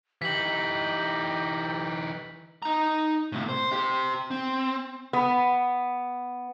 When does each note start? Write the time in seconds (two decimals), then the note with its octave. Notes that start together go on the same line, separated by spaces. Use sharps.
0.22 E3 D#4 G4 B6 F#7
2.62 D#4 A#5
3.32 A2 C3
3.49 C5
3.72 G4 C5
4.31 C4
5.13 B3